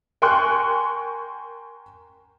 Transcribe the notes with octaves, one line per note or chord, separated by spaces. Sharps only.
A#4 G5 G#5 C6 C#6 F#6